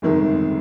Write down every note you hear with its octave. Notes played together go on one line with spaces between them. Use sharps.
G1 F2 C3 D#3 G#3